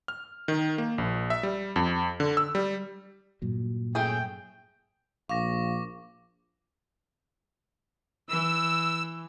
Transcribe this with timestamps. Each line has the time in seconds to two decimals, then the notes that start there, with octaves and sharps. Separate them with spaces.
0.08 F6
0.48 D#3
0.78 A#3
0.98 A#1
1.30 E5
1.43 G3
1.76 F2
2.20 D3
2.37 E6
2.55 G3
3.42 G2 A#2 F#3
3.95 A3 C#4 G#4 G5
5.29 A#1 F5 C#6 D6 A#6
8.29 E3 E6